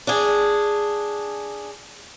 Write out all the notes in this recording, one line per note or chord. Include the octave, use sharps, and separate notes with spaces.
D4 G#4